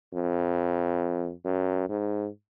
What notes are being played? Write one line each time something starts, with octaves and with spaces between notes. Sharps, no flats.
F2
F#2
G#2